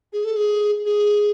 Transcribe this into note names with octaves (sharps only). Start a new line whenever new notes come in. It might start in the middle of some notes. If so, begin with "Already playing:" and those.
G#4
A4
G#4
G#4